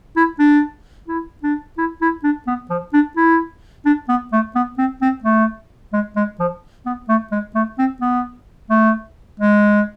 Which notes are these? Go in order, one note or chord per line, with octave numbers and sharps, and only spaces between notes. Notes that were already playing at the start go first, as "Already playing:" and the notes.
E4
D4
E4
D4
E4
E4
D4
B3
F3
D4
E4
D4
B3
A3
B3
C4
C4
A3
G#3
G#3
F3
B3
A3
G#3
A3
C4
B3
A3
G#3